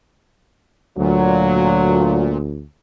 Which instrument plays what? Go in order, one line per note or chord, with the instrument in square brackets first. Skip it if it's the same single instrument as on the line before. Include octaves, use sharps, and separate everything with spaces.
[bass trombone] D2 [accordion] A#2 [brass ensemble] F#3